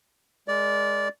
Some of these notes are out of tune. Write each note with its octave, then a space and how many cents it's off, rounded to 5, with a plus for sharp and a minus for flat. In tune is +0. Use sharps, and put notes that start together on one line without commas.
G#3 +0 A#4 +10 D5 -15